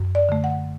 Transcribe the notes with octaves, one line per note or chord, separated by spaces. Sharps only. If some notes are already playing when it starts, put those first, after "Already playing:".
Already playing: F#2
D5
D3 A3
F#5